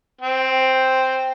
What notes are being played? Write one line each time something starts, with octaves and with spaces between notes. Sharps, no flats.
C4